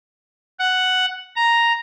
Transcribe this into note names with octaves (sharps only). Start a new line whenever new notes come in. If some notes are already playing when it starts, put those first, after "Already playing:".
F#5
A#5